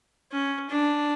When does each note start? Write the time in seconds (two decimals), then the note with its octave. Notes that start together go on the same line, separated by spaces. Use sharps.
0.32 C#4
0.70 D4